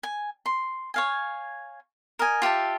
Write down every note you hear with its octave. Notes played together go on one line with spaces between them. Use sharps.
G#5
C6
C#5 F5 G#5
A#4 D#5 G#5
F4 G4 E5 A5